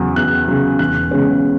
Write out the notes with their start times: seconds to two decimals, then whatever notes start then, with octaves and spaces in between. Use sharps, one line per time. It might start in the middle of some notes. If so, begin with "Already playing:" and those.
Already playing: E2 C#3 F#3
0.16 E2 F#6
0.48 C#3 F#3
0.79 E1 F#6
1.11 E2 C#3 G#3 C#4